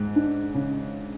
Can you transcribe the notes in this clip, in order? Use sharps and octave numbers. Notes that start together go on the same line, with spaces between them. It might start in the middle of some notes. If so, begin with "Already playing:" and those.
Already playing: G#2
D4
C#3